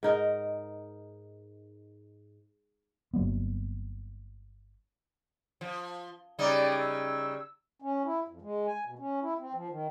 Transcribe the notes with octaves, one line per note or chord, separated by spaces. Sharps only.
G#2 D#4 A#4
G1 F#3 A#3 B3
F3
C#3 G3 D#4 D5
E6
C#4
E4
F2
G#3
G#5
B2
C#4
E4
C4
F3
D#3